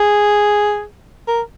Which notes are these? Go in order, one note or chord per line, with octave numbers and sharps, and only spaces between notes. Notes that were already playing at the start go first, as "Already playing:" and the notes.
Already playing: G#4
A#4